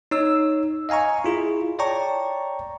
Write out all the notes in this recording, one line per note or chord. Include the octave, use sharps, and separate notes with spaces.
D#4 C#5 E6
D#5 F5 G#5 A#5 C#6
E4 F4 G#4
C#5 D5 G5 A5 A#5 C#6